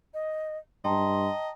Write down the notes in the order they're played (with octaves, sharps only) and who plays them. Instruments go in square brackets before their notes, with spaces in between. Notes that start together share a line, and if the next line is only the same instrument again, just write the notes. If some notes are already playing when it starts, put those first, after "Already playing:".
[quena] D#5
[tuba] G2 [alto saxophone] D#5 [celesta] G5 A5 A#5 [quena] C6